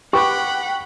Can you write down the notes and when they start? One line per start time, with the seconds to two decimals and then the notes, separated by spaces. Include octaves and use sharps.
0.13 G4 B4 F#5 G5 B5 C#6